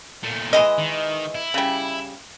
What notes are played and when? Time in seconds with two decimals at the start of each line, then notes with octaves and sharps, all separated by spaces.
0.23 A#2 A3
0.53 E3 G#3 D#5
0.78 D#3
1.35 E4
1.54 C#3 G3